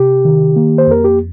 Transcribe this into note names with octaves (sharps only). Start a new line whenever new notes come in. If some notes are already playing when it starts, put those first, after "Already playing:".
Already playing: C3 G4
D#3
A#3
C5
F2 A#4
G4